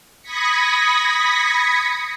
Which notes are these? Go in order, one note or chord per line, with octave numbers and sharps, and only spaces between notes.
B5 D#6 G#6 A#6 B6 C#7